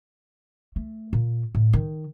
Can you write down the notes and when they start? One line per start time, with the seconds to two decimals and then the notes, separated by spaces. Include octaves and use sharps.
0.76 A3
1.13 A#2
1.55 A2
1.73 D#3